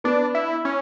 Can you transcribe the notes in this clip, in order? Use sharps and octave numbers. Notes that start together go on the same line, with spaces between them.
B3 D4
E4
C#4